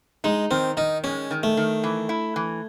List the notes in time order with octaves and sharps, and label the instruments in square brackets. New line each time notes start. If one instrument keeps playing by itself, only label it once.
[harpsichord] G#3 [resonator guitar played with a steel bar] D#4
[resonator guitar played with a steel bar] D#3 [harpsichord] C4
[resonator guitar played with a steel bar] D#3 [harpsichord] D#4
[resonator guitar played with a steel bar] G#3 [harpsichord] C#4
[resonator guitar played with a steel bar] D#3
[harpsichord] A3
[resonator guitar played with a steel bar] D#3
E3
E4
E3